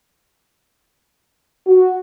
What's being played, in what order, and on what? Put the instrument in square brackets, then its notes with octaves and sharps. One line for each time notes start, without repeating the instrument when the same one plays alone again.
[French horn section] F#4